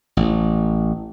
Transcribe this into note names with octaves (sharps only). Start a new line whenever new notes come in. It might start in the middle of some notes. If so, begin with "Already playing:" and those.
A1